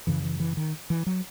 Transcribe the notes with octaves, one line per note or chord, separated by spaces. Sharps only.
F#2 C#3 E3
E3
E3
D#3
E3
F#3